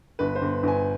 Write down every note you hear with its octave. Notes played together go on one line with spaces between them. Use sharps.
G1 B4
C5
G1
G1 G#5